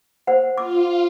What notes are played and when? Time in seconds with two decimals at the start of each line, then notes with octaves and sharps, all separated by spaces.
0.27 C5 F#5
0.58 F4 D6